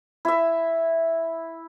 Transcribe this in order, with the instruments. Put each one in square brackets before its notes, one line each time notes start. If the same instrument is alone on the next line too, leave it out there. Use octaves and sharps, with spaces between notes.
[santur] E4 E5